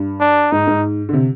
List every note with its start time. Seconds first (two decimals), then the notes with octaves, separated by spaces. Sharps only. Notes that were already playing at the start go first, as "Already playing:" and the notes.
Already playing: G2
0.20 D4
0.52 G#2 D#4
0.67 G#2
1.09 D3
1.13 C3